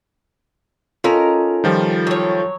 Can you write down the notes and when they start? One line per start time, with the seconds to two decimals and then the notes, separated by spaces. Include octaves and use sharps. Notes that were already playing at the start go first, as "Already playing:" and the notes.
1.04 C#4 D#4 F4 A4 A#4
1.64 D#3 F3 G3
2.07 F#3 C#5